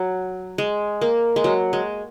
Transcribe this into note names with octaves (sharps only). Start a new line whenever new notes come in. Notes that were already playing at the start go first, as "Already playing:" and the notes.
Already playing: F#3
G#3
A#3
G#3
F#3
G#3